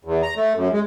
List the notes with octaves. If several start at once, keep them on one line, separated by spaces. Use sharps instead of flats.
E2
A#5
A3
F#2
G#3